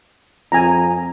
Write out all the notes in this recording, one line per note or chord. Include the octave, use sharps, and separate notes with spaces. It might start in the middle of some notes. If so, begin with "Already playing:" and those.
F2 G#5 A#5